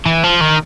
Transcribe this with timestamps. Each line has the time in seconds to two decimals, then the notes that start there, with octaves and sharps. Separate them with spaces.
0.06 E3
0.24 F3
0.41 D#3